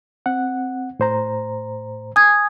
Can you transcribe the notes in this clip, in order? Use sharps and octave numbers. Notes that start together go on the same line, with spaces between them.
C4 F#5
A2 C5 A#5
G#5 D#6 G#6